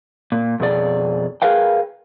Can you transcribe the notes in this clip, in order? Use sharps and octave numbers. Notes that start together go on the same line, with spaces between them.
A#2
F2 B2 G#4 D5
G#4 A#4 B4 F5 G5